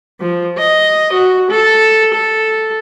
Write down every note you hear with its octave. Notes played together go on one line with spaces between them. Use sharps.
F3
D#5
F#4
A4
A4